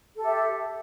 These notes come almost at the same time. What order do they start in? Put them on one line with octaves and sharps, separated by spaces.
A4 G4 E5